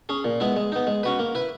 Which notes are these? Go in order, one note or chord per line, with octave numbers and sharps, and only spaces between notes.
C#4 G#4
A#2
G#3 B3 E4
G#3
B3 D#4
G#3
C#4 F#4 B4
A#3
E4 B4